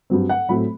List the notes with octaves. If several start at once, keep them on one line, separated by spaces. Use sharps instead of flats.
G2 F#3 C4
F#5
A2 F#3 A3 C4 B5